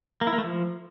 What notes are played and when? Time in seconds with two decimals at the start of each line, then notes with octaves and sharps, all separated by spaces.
0.21 A#3
0.27 E4
0.33 A#3
0.38 A3
0.44 F3